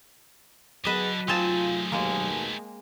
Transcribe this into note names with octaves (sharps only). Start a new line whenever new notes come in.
D3 F#3 B3 G#4 B4 D#5 A5
A3 C4 D#4 F4 G#4 A5
D#2 B2 G#3 A#3